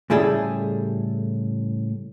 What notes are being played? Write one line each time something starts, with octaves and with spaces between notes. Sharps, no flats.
A2 C#3 G3 E4 G#4 A4